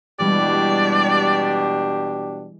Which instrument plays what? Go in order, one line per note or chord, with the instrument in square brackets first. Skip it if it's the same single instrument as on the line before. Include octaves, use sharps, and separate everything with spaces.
[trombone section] B2 D4 G4 [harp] E3 G3 G#3 [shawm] D5